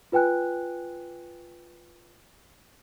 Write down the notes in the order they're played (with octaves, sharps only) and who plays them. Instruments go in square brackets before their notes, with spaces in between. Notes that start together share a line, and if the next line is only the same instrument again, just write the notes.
[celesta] F4 B4 G5 G#5 F#6